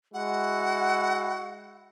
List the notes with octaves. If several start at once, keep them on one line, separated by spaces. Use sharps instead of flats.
G#3 E4 F#4 F#5